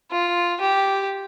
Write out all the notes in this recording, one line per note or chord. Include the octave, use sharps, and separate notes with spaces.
F4
G4